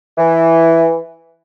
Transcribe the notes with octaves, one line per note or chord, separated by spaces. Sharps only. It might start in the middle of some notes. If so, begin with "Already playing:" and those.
E3